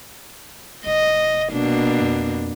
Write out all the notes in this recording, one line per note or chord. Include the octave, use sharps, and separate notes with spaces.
F1 D#5
B2 A#3 D4
F2